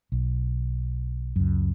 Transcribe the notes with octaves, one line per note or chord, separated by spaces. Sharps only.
B1
C#2 F#2